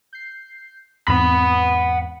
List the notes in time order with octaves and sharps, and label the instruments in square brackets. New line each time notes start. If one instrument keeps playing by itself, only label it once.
[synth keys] G6 C7
[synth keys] E2 G#2 C4 [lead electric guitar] F#5 B5